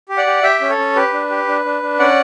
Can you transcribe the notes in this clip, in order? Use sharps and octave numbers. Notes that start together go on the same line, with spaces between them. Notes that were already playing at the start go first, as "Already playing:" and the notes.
G4
D5 F#5
G4
G4 E5 G5
C#4
A4 C#5
C#4
G4 B4
D4
G4
D4
D4
D4
C#4 D5 F#5